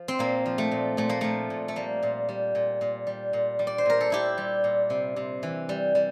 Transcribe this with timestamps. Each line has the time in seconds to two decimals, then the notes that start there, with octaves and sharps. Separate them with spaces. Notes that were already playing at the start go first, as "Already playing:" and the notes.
Already playing: F3
0.08 C4
0.19 A#2 A#3
0.46 F3
0.58 A3
0.72 A#2
0.97 A#2 A3
1.09 A#3
1.21 F3 A3
1.50 A#2
1.68 A3
1.76 G3 A#3
2.03 A#2
2.29 G3
2.55 A#2
2.81 A#2
3.07 G3
3.33 A#2
3.59 G3
3.67 D5
3.78 C5
3.86 A#2 A#4
4.01 A4
4.10 A#2 E4 G4
4.38 G3
4.64 A#2
4.90 C3
5.16 C3
5.43 E3
5.69 G3
5.95 G3